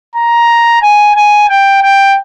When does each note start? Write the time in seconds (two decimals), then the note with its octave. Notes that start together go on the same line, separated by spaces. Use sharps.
0.16 A#5
0.82 G#5
1.16 G#5
1.49 G5
1.82 G5